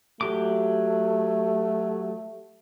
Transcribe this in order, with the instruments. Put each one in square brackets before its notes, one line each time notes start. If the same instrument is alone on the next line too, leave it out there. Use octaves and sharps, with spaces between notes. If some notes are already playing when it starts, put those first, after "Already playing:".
[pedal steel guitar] F#3 G4 D6 [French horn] A3